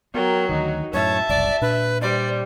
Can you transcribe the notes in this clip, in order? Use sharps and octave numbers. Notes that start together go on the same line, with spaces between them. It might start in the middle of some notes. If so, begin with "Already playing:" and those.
F#3 B3 A#4 G5
D2 D#3 D#4 F#4
F#2 A2 C#5 E5 A5
F#1 C2 D5
A#2 D4 B4
G3 C5 D5